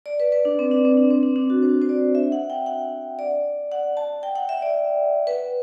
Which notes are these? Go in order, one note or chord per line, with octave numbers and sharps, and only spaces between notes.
D5
B4
B4
D4
C4
D4
C4
D4
C4
D4
D4
F#4
C5
C5
D5
E5
F#5
G5
F#5
D5
F#5
A5
G5
F#5
E5
D5
B4